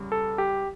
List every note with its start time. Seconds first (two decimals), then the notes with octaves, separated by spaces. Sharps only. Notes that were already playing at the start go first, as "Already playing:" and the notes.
Already playing: E2 C#3 G3
0.12 A4
0.38 G4